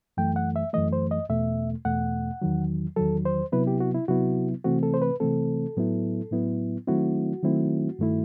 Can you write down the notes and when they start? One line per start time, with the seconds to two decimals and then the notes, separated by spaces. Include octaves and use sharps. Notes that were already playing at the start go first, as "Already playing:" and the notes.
0.17 F#2 E3 A3 G5
0.36 F#5
0.56 E5
0.73 F#2 E3 A3 D#5
0.93 C5
1.11 D#5
1.29 E2 B2 A3 E5
1.85 E2 B2 A3 F#5
2.42 E2 D#3 F#3
2.96 E2 D#3 F#3 A4
3.26 C5
3.52 C3 F#3 B3 E4 B4
3.67 G4
3.80 F#4
3.94 E4
4.08 C3 F#3 B3 E4 F#4
4.64 C3 E3 A3 C4 F#4
4.83 A4
4.94 C5
5.02 B4
5.20 C3 E3 A3 C4 A4
5.77 A2 F#3 B3 E4
6.31 A2 F#3 B3 E4
6.87 D#3 F#3 A3 C4 E4 F#4
7.43 D#3 F#3 A3 C4 E4
7.99 G2 D#3 A3 E4